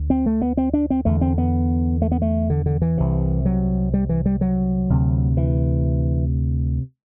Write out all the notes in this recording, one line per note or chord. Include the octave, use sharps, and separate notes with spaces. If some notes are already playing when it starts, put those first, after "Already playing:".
Already playing: D2
C4
A3
B3
C4
D4
C4
E2 D3 A3
C4
B3
A3
B3
A3
D3
D3
E3
C2 C3
F#3
G3
E3
G3
F#3
D2 C3
E3